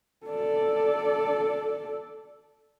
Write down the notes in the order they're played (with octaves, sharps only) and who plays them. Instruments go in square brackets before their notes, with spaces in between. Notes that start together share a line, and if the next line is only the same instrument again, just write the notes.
[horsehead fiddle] A4 D5